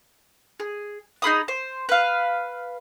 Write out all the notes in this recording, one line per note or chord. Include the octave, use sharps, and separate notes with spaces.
G#4
D#4 G#4 B5 D#6
C5
B4 F5